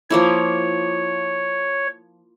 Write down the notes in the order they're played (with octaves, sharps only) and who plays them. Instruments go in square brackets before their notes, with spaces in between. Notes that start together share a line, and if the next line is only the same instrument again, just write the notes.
[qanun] F3 A#3 E4 [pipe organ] C#5